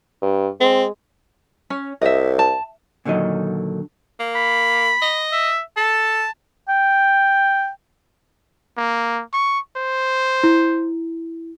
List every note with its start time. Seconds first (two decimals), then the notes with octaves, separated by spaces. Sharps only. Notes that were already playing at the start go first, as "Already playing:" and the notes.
0.22 G2
0.61 G#3 C4
1.70 C#4
2.02 C2 D#5 E5
2.39 A5
3.05 A#2 D3 D#3 F#3 D#5
4.20 A#3
4.35 B5
5.02 D#5
5.32 E5
5.77 A4 A5
6.69 G5
8.77 A#3
9.33 C#6
9.76 C5
10.43 E4